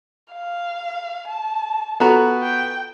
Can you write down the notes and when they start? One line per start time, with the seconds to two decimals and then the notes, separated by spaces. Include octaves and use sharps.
0.32 F5
1.28 A5
2.00 B3 F4 F#4 A4 A#5
2.43 G5